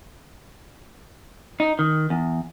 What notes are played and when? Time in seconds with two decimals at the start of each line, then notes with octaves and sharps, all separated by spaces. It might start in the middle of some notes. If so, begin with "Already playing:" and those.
1.60 D#4
1.79 D#3
2.10 E2